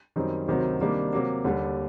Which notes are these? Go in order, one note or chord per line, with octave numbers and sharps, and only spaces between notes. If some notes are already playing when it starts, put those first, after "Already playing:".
F#2 D#3 G3 C4 D#4
D2 C3 D#3 F#3 C4
C3 D#3 G3 A#3 D4
C3 F#3 A#3
D#2 D3 G3